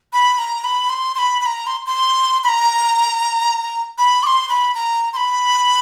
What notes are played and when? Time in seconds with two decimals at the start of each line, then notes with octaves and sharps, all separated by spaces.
0.13 B5
0.38 A#5
0.64 B5
0.89 C6
1.15 C6
1.18 B5
1.41 B5
1.46 A#5
1.67 C6
1.86 C6
2.44 B5
2.49 A#5
3.98 B5
4.23 D6
4.27 C6
4.49 B5
4.75 A#5
5.13 C6
5.17 B5